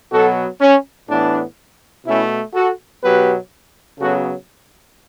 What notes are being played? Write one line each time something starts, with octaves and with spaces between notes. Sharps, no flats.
B2 F#3 B3 F#4 A4
C#4
A2 E3 B3 D4
B2 A3 C#4 E4
F#4 A4
B2 F#3 B3 G4 B4
C#3 F#3 B3 F#4 A4